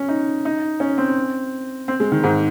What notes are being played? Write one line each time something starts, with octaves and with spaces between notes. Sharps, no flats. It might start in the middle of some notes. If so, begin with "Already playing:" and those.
Already playing: C#4
D#4
D#4
C#4
C4
C4
G#3
D#3
G#2